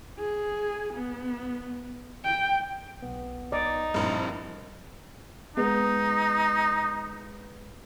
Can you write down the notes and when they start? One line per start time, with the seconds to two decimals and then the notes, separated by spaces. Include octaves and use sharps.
0.19 G#4
0.94 B3
2.25 G5
3.02 B1 B3
3.52 D#4 D5
3.94 A#1 G2 C4 E4 A#4
5.57 G#3 B3 D#4